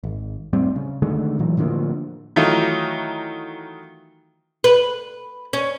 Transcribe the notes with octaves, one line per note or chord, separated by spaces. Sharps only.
G#1
A2 G3 C4
C#3
D3 D#3 G#3 A3
A#2 E3 F#3
A2 D3 F3 A#3
D#3 E3 F#3 A3 D#4 F4
B4
C#4